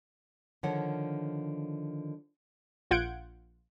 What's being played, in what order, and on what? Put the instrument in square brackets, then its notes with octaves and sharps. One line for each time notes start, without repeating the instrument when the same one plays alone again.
[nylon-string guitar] D3 D#3 F3 C#5 F#5
[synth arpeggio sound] A#1 F4 F#5 G6 G#6 D7